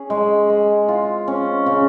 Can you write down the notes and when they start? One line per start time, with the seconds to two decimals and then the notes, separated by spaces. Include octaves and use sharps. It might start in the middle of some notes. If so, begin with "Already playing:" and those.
Already playing: C#4 G#4
0.10 G#3
0.49 G#3
0.88 F4
1.28 C#4
1.66 C#3